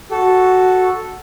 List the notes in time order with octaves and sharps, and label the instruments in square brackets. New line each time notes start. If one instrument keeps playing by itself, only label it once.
[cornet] F#4 [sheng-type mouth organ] A4